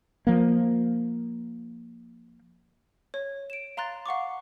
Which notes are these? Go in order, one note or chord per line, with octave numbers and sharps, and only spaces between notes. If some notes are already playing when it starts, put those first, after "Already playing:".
F3 A#3
C#5
D7 E7
F5 A#5 C6 F#6 A6
F5 F#5 C#6 D6